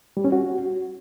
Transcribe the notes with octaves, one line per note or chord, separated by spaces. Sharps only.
G3
C#4
F#4